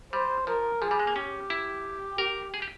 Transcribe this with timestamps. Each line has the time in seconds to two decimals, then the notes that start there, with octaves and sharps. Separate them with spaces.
0.13 G3 C5
0.47 F3 A#4
0.82 F3 G#4
0.91 G3
0.99 G#3
1.07 A#3
1.16 C#4 G4
1.50 E4
2.18 G4 A#4
2.54 G#4
2.62 G4